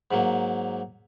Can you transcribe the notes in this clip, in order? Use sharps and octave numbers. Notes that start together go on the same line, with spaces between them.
G#2 F#3 A#3